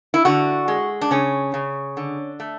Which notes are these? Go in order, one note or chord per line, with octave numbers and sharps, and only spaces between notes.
E4
D3 F#4
G#3
D4
C#3 C#4
C#3
D3
A3